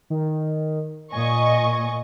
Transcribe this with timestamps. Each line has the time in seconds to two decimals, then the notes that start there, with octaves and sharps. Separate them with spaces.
0.10 D#3
1.12 A#2 D#5 G#5 C#6